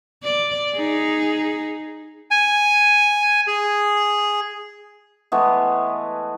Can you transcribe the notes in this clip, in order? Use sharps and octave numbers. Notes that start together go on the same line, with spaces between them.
D5
D#4 G#4
G#5
G#4
E3 G#3 A3 B3